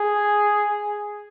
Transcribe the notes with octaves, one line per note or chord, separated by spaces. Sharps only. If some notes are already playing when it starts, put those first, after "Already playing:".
Already playing: G#4